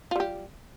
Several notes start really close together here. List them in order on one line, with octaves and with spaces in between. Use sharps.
F4 G3 G4